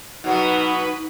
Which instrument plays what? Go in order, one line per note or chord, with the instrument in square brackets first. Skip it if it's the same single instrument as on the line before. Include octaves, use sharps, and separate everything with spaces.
[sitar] B2 F#3 B3 [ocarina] D#4 [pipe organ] B4